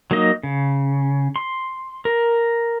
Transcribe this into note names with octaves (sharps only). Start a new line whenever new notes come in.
F#3 A#3 D#4 D#5
C#3
C6
A#4